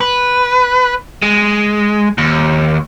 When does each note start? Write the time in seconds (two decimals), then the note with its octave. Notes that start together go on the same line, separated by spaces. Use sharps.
0.01 B4
1.22 G#3
2.18 D#2